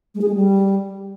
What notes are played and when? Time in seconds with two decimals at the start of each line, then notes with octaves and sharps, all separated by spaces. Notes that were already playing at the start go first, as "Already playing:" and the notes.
0.15 G#3
0.21 G#4
0.28 G#3
0.35 G3